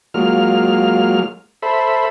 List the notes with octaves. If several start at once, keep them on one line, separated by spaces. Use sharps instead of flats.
F#3 G#3 A#3 F4 F6
A4 C5 E5 B5